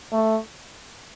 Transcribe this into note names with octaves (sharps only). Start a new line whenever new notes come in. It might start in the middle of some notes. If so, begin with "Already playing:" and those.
A3